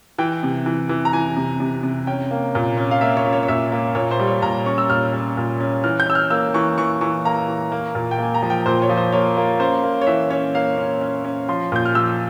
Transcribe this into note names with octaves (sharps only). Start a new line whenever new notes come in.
E3 G5
C3
E3
E3
A#5
E3 G#5
C3
C3
C3
C#4 G5
A#3
A#2
C#4
F5
A#3 E5
C#5
C#4
C#5
C#5
A#2 E5
A#3
A#2 C#5
C5
G3
C#5
A#2 A#5
C#4 C#6
E6
A#2 F6
C#4
A#2
C#4
E3 F6
G6
C#4 E6
F6
A#3 E6
E3 C#6
E3 C#6
E3 C#6
A#3 A#5
E3
A#3
A#2
G5
A#3 G#5
A#5
F3
G5
A#2 C5
C#5
F3
C5
A#3 C#5
A#3
C#4 C5
A#3
C#5
E3 E5
C#4 C#5
A#3 F5
C#4
C#4
C#4
F3 C6
A#2 G6
F6
F3 E6